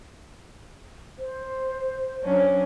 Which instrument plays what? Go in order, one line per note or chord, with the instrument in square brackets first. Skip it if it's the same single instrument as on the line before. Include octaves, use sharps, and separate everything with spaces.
[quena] C5
[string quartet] F#3 C#4 D4